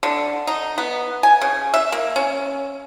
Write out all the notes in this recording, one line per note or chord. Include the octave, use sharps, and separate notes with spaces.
D3
D#4
B3
G#5
C#3
E5
A#3
C#4